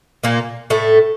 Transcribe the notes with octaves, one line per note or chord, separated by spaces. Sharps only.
A#2 A#3
A2 A3